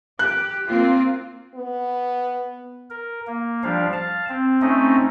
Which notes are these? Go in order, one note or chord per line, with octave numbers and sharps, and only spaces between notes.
G4 F#6
A#3 C4 F4
B3
A#4
A#3
F3 G3 D4 F5
F5 A5
C4
A3 C4 C#4 D#4 D#5